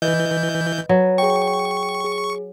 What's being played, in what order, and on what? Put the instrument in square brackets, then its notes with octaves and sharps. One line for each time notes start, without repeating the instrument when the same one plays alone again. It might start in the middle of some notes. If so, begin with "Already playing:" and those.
[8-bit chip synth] E3 G6 [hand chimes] B4 D#5
[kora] F#3 B4
[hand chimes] G#4 G5 [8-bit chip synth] C#6
[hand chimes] G#4